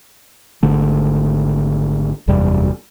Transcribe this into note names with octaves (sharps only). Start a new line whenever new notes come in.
G#1 D3 A3
F#1 E2 C3 G3